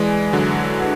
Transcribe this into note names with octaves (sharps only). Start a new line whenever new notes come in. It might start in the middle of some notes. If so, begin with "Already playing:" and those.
Already playing: E3 G#3 B4 D5 G#5
D3 F#3
D4 G#4 B4 F#5